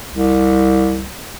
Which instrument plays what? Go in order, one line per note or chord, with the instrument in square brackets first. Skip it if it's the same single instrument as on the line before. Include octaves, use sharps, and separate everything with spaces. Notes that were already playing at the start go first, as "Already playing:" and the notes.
[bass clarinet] C2